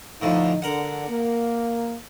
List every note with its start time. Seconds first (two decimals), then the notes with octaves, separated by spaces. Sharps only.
0.22 A2 D3 F3 D#4
0.62 D3 A#4 F#5
1.08 A#3